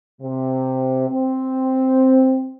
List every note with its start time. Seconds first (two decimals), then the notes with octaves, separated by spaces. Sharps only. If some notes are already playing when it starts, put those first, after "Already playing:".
0.21 C3
1.09 C4